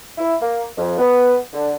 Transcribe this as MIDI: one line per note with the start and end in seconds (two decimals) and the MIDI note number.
0.18 0.35 64
0.42 0.64 58
0.78 0.96 41
0.98 1.36 59
1.53 1.75 50